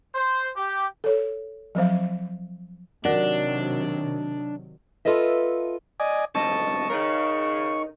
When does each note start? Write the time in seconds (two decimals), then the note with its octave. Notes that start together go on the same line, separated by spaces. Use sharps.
0.15 C5
0.56 G4
1.04 A4 C#5
1.75 F3 F#3 C4 C5 F5
3.05 C3 D#3 F#3 D4 F#4 A#4 D5 F#5
5.05 F4 A4 B4 D#5 E5
6.00 D5 D#5 G#5
6.35 F2 G#2 D3 D#5 A5 C#6
6.90 C#3 D#4 A#4